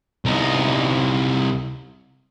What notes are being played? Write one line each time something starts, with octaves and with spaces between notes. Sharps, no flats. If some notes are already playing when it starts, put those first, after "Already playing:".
C2 D#4